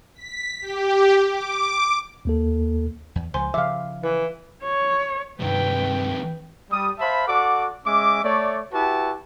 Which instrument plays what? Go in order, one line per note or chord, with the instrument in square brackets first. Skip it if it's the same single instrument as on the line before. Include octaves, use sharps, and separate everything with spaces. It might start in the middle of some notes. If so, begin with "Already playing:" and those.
[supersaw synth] B6
G4
D6
[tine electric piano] D#2 A#3 A4
[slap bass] E2
[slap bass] C#2 F3 [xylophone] C5 G#5 C6
[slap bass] C#3 F3 [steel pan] E5 F5 [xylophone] D6
[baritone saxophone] E3 [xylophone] B4
[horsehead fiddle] C#5
[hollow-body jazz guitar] C2 G2 [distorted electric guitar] C3 D#3 [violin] B4 G5
[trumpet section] G3 D#6
C5 E5 F5 A5 B5
F#4 A4 D5 F#5 D6
G#3 C#4 E5 D6
A3 C#5 D5
E4 F#4 G4 B4 F#5 A5